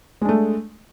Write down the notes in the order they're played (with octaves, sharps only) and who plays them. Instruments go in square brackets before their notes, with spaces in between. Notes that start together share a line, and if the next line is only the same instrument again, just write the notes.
[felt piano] G#3
D4
A3